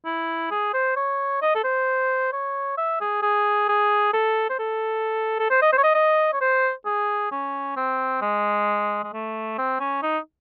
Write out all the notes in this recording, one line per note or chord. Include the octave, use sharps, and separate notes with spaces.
E4
G#4
C5
C#5
D#5
A4
C5
C#5
E5
G#4
G#4
G#4
A4
C5
A4
A4
C5
D#5
C5
C#5
D#5
D#5
C#5
C5
G#4
C#4
C4
G#3
G#3
A3
C4
C#4
D#4